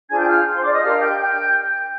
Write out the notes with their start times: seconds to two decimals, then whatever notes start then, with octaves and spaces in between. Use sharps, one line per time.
0.09 D4 F4 G#4 C5 G#5 G#6
0.18 G5 G6
0.27 F5 F6
0.53 C5 C6
0.63 D5 D6
0.72 D#5 D#6
0.81 D4 G4 A#4 F5 F6
0.99 G5 G6
1.17 G5 G6